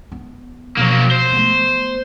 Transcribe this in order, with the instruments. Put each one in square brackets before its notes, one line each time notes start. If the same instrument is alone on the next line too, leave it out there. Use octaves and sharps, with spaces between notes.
[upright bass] B3
[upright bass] B2 F3 [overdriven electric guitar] F#3 A#3
[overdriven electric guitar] C5
[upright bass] A3 B3